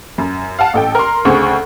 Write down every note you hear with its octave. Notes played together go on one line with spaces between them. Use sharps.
F#2
F5 F#5 A5
A1 A4 G5
A#4 C6
D2 C#3 C4 G#4 C#6